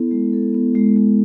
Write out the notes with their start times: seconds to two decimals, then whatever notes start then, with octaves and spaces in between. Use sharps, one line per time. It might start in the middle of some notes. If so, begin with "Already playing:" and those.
Already playing: B3 E4 A4
0.11 G#3
0.33 A4
0.54 B3
0.75 G#3
0.97 G#3